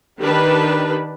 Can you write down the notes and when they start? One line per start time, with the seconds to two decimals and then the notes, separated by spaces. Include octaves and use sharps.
0.20 D#3 D4 G4 B4